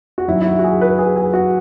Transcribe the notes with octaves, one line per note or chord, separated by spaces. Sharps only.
F#4
F#2 D#3 E4
E4
F#4
F#4
G#4
B4
G#4
G#4
F#4